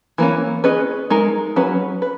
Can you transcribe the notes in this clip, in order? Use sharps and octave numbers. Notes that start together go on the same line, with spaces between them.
E3 A#3 C#4
C#4 G#4 B4 D#5
G#3 D#4 A#4
F#3 C#4 G#4 B4
B4